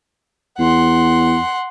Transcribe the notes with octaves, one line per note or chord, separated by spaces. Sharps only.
E2 F#5 C6